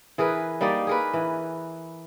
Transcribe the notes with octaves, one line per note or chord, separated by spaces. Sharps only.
E3 G#4 A#4 B4
G3 A#3 D#4 D5
G#4 A#4 B4
E3